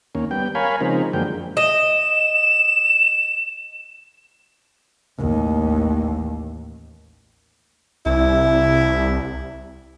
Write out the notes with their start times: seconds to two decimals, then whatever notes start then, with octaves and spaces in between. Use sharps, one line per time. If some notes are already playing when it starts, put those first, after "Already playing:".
0.15 D#2 A#3 C#4
0.31 G3 B3 G5
0.55 A#4 C#5 F5 G#5 B5
0.80 C#3 F3 G#3 C4 D#4 A#4
1.13 F#2 D3 F3 G#3 A#3 G5
1.57 D#5 E7
5.18 A1 D#2
8.06 C2 E4